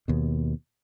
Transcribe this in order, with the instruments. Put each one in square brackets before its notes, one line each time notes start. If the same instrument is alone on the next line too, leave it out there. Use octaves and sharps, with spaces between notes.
[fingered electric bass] D#2 B2